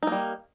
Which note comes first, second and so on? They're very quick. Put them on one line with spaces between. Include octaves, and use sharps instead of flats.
D#4 A#3 G3